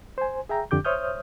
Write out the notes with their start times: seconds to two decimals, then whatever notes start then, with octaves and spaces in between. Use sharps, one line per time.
0.18 C5 G#5
0.49 G#4 E5 G5 A#5
0.71 F2 D3 G4 D6 G6
0.85 C5 C#5 E5 D#6 F6 G6